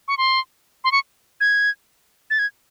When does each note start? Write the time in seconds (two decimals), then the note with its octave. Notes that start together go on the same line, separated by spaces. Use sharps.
0.08 C#6
0.18 C6
0.84 C6
0.92 C#6
1.41 G#6
2.30 A6
2.39 G#6